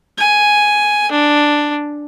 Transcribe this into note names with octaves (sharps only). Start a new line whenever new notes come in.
G#5
D4